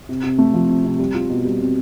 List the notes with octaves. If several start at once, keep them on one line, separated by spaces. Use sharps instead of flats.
C3
C3
A3
F3
C3
C3
G3
F4
B2
G3
C4